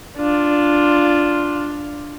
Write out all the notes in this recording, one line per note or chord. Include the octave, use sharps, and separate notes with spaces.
D4 F4